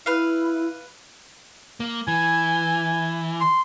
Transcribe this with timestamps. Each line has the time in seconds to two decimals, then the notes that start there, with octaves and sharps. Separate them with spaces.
0.06 E4 B4 F5
1.80 A#3
2.08 E3 G#5
3.41 C6